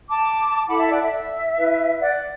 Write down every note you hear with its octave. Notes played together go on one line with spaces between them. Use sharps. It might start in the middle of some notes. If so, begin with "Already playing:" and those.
A5 D6
E4 A4 F#5 B5
E5 A5
D5 F#5
E5
E4 B4
D5 F#5